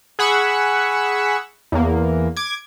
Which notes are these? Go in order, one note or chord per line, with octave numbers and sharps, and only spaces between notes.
G#4 F#5 B5 C#6 E6
E2 A#3
D6 G#6